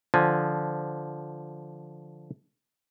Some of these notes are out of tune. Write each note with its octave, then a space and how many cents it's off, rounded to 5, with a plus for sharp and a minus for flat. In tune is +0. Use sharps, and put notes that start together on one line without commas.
D3 +0 F3 +0 G#5 +0